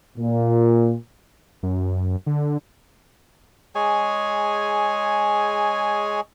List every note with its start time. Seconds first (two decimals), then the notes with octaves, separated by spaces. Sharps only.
0.18 A#2
1.63 F#2
2.26 D3
3.75 G#3 G#4 C#5 G#5